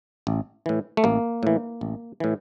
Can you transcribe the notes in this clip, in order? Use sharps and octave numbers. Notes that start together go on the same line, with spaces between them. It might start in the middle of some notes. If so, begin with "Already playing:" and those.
A1
A2 E3
A3
A1 A#3
A2 E3
A1
A2 E3